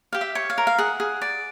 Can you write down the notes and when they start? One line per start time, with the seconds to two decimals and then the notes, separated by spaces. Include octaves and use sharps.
0.13 G4 F5
0.21 E5
0.35 C#5
0.50 F5
0.58 A#4
0.67 F5
0.78 G#4 F#5
1.00 G#4
1.22 D5